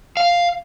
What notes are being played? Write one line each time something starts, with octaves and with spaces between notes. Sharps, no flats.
F5